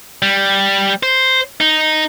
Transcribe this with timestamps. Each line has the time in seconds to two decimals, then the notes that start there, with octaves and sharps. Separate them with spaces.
0.22 G3
1.03 C5
1.60 D#4